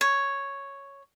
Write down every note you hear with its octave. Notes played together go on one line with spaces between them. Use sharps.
C#5